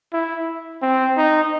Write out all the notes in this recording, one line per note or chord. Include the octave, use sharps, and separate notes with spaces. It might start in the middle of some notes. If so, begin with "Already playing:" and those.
E4
C4
D#4